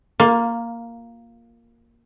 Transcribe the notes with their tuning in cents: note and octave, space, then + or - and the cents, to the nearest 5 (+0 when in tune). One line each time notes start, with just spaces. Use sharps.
A#3 +0 F4 +20